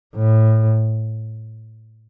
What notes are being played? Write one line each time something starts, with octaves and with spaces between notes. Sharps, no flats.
A2